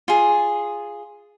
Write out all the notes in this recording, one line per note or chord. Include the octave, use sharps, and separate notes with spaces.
F4 G#4